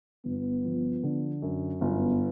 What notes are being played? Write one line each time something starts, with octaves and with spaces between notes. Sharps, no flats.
G1 B3
F3
D3
F#2
G1 B3